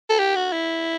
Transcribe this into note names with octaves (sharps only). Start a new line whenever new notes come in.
A4
G4
F#4
E4